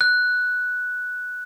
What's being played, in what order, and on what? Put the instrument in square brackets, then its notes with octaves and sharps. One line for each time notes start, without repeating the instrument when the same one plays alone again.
[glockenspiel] F#6